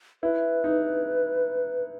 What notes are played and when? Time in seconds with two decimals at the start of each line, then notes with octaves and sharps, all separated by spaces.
0.23 E4 B4
0.64 D#4